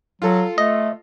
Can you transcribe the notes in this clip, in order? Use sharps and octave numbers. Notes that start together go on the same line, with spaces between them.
F#3 F4 A4
A3 D#5